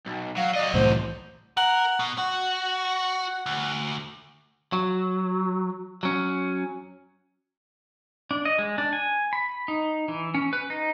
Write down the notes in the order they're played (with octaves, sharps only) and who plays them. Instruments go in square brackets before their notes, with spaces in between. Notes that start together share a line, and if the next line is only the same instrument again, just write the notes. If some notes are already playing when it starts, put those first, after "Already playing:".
[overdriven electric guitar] B1
[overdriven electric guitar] F#3 [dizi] F5
[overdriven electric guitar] F#3 D#5 [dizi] D5
[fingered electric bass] C2 A2 E3 [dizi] C5
[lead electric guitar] A#4 [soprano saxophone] F#5
[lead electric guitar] B2
[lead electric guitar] F#4 [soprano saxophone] F#5
[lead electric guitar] D2
F#3
F#3 C#4
[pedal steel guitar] D4
D#5
G#3
D4
G#5
B5
D#4
E3
C#4
B4
D#4